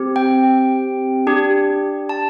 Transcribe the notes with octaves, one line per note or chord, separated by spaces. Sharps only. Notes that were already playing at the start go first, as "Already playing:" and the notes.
Already playing: C4 G4
G5
D4 G4
A5